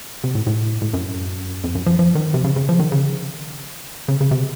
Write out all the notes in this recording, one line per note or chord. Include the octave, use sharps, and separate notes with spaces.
C3
A2
A2
A2
F#2
F2
F#2
F3
F3
D#3
C3
C#3
C#3
F3
D#3
C#3
C#3
C#3
C3